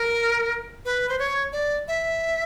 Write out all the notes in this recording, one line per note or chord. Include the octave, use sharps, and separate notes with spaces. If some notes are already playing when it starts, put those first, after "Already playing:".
Already playing: A#4
B4
C5
C#5
D5
E5